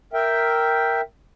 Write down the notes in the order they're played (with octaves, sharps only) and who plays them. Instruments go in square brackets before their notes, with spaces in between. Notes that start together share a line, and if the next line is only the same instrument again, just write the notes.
[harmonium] A#4 E5 G5